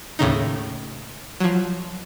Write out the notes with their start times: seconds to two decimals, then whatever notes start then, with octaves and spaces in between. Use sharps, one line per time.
0.19 D#2 A2 C#3 D#4
1.40 F3 F#3